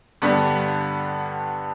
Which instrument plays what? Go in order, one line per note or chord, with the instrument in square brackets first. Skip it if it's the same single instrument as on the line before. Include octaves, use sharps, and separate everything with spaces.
[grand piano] G2 D3 G3 B3